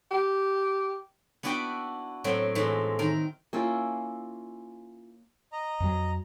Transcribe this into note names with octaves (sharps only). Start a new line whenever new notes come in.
G4
B3 D4 E4 F#4 G5
A2 F#3 C4
A2 E3 G#3
D#3 A#4
A#3 C#4 E4 F4
D#5 A#5
F2 F#3